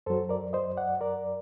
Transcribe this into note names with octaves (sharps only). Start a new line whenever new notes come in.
F#2 F#3 A4 C5
A#4 D5
C5 D#5
D5 F#5
A#4 D5